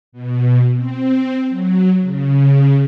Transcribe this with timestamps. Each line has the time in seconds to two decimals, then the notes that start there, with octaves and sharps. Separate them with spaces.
0.12 B2
0.75 C4
1.49 F#3
2.01 C#3